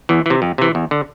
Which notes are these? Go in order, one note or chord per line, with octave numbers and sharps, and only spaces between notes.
E2 E3
C3 E3
F2
C3 E3
E2
D3